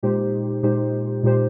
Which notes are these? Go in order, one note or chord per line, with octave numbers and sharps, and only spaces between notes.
A#2 G#3 D#4 G4 C5
A#2 G#3 D#4 G4 C5
A#2 G#3 D#4 G4 C5